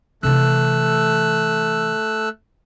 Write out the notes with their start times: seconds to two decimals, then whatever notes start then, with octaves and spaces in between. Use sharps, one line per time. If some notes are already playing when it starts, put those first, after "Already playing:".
0.23 C3 E3 A3 E6 F#6